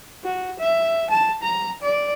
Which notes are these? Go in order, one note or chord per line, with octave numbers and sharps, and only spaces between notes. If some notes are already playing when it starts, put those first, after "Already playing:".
F#4
E5
A5
A#5
D5